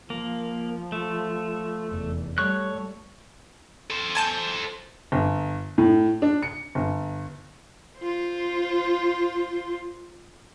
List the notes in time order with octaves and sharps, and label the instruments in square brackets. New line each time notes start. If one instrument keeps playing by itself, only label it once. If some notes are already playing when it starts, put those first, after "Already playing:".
[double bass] F3 [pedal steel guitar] A#3
[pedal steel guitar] A3
[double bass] F1 E2
[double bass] G3 A3 [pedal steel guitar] C#5 C#6 F#6
[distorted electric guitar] A4 C5
[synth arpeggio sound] G#5 A5 G6
[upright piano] G1
A2
D4
C#7
G1
[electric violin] F4 C5